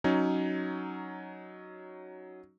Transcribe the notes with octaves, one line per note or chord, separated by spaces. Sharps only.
F#3 C#4 D#4